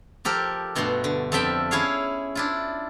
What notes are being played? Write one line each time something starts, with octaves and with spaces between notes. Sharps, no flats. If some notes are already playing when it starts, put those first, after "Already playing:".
F3 G4 A4 A#4
G2 B2 A3 F#4 C6
D3
F2 F3 A4 E5 G5 B5
C#4 E4 G#4 C#5 F5
D4 E4 F4